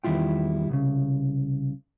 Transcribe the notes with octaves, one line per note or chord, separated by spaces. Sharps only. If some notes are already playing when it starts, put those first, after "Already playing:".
E2 D#3 G3 E4 F4 G5
C2 A#2 C#3